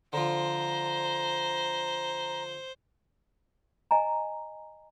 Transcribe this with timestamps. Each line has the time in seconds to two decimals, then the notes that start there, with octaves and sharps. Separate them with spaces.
0.13 D3 F3 C5 A#5
3.91 D#5 G#5 A#5